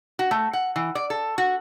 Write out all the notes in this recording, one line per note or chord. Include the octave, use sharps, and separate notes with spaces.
F#4
A3
F#5
E3
D5
A4
F#4